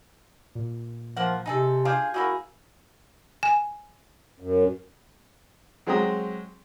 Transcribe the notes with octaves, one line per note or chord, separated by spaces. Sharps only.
A#2
F3 A#3 F#5
C3 D#4 G#4 A4
D4 F4 G#4 F5 G6 G#6
A#3 E4 F#4 G#4
G#5
F#2
F#3 G#3 C4 G5 A#5 D#6